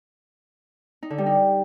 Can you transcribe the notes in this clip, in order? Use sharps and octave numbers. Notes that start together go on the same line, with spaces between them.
D#4
D3
G3
D#4